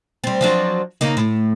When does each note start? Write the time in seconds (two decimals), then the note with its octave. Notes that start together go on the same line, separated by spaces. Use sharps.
0.24 G3 C4
0.41 F3 F#3 D4
1.01 C#3 A#3 D#4
1.17 A2